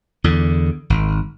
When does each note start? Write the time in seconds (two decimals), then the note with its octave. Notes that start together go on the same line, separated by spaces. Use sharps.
0.24 E2 D3
0.90 G#1